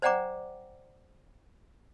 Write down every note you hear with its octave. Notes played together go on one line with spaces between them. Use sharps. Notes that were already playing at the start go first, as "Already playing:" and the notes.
C5 D5 F#5 G5 A#5 D6